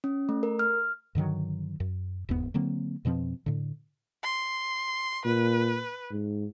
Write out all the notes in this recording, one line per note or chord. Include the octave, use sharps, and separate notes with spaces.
C#4
A3
A#4
F6
G2 D3 D#3 F#3
F#2
E1 D#2 G#2 B3
D3 F#3 A#3 C4
F2 B2 F3 C4
A2 D3
C6
A#2 B4
G#2